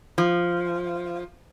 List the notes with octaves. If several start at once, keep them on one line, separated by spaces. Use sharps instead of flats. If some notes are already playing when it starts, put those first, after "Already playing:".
F3